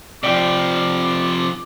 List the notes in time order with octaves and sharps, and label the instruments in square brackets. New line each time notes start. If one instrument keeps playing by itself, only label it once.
[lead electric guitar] C3 F3 [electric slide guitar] D5 G5 [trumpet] D6